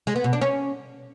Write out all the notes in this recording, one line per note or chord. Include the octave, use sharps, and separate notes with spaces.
G#3
B3
B2
D4
C#4